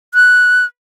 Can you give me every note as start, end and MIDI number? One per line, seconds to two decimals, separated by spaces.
0.14 0.65 90